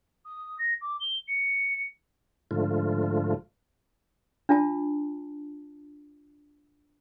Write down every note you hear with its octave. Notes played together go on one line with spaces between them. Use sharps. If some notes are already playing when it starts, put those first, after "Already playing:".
D#6
A#6
D6
G7
C#7
G#2 D3 F3 A3 F4
D4 F4 A5